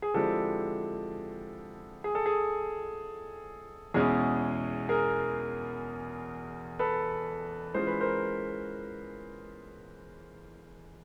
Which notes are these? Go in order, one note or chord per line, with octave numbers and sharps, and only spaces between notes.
G#4
D3 F3 G#3 C4 E4 G4 A4
G#4
A4
G#4
E2 B2 G#3 C#4 E4 G#4
G#4 A#4
A4 B4
E3 G#3 C#4 F4 C5
B4
A#4 C5